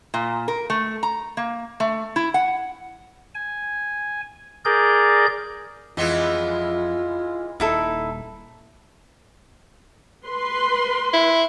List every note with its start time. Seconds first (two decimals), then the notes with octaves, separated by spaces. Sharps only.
0.14 A#2
0.48 A#4
0.70 A3
1.03 A#5
1.37 A#3
1.80 A3
2.16 E4
2.34 F#5
3.35 G#5
4.65 G#4 A#4 D5 G6
5.97 F2 E3 G#3 B3 F4
7.60 D#1 D#4 E4 A4
10.27 B4 C6
11.13 E4